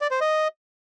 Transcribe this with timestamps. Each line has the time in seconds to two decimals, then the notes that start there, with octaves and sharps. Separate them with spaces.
0.01 D5
0.11 C5
0.21 D#5